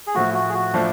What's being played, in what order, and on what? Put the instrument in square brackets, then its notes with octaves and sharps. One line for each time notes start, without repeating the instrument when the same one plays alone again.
[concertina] G#4
[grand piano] A2 F3 A3 [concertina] F#4
[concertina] F#4
G#4
F#4
[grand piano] A2 F3 A3 [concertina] D4